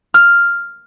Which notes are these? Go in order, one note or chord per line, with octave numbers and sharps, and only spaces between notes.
F6